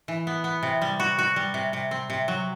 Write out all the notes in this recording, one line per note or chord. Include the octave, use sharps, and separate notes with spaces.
E3
B3
B3
C3
G3
F#4
F#4
G3
C3
C3
C4
C3
F#3